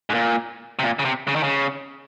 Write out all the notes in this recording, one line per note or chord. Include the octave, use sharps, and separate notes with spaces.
G#2
A#2
C3
A#2
C#3
C3
C#3
D#3
C#3